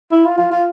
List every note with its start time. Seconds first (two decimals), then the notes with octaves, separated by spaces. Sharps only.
0.11 E4
0.25 F4
0.38 F4
0.52 F4